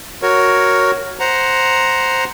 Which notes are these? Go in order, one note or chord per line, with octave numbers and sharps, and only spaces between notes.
F#4 A#4 C#5
C5 F#5 A#5